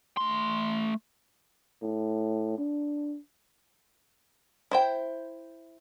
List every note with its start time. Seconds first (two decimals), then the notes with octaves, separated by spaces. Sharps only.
0.17 A3 C6
1.82 A2
2.58 D4
4.71 E4 C5 G5